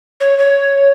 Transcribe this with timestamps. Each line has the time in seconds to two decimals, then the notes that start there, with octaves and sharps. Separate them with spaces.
0.20 C#5
0.38 C#5